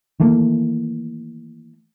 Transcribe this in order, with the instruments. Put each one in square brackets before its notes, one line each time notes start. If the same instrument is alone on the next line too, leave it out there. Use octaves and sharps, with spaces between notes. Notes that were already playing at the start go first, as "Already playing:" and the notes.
[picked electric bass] D#3 E3 A3 A#3